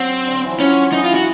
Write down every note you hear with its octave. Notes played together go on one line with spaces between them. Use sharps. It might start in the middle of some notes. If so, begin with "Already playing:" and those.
Already playing: F#3 C4
D3
E3
F3
F#3 C#4
E3 D#4
F4
F#4